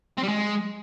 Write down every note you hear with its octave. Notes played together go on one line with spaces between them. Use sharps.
C4
G3
G#3